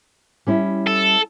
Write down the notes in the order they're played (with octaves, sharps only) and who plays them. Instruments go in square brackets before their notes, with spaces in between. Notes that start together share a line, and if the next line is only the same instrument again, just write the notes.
[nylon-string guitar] G3 C#4 E4
[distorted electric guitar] A4